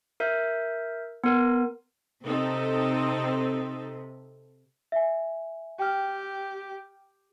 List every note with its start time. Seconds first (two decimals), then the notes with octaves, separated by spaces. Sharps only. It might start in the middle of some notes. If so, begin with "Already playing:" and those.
0.20 A#4 E5 G6
1.24 B3 A#4
2.25 C3 C4 D#4 A4
4.92 E5 G#5
5.79 G4 G5 F6